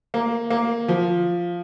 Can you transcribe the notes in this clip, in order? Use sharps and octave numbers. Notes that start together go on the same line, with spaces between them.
A#3
A#3
F3